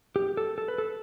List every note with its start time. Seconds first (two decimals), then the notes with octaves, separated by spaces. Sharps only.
0.16 G4
0.37 A4
0.58 A4
0.68 B4
0.78 A4